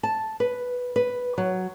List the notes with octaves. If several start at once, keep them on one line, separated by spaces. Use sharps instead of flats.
A5
B4
B4
F#3